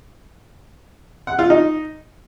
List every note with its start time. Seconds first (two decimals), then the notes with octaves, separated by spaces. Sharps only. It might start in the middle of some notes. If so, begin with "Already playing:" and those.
1.27 F#5
1.39 F4
1.50 D#4